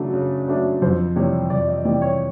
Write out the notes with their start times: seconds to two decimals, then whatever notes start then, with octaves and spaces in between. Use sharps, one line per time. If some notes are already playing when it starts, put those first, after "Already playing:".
Already playing: C#3 F#3 A3 D4
0.13 C#3
0.48 F#3 A3 D4
0.82 F2 C5
1.16 C3 E3 G3 C#5
1.50 F2 D5
1.67 D#5
1.85 C3 E3 G3 D5
2.02 C#5